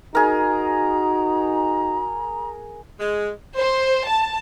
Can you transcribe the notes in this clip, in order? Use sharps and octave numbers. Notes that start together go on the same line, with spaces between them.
D#4 F#4 G#4 A#4 A#5
G#3
C5
A5